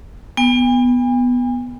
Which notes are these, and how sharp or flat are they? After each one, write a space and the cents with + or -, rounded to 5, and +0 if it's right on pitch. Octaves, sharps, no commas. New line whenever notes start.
B3 +0 G#5 -45